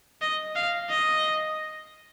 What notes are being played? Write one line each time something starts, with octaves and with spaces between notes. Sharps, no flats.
D#5
F5
D#5